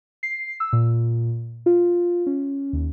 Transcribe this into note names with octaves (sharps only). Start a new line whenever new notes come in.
C7
E6
A#2
F4
C#4
D#2